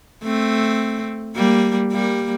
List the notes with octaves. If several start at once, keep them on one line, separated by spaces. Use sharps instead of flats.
A3 C4
G3 A#3
G3 A#3